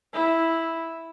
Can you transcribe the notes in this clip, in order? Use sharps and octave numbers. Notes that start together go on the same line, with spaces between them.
E4